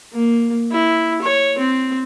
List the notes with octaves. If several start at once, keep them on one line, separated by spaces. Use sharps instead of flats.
A#3
E4
C#5
C4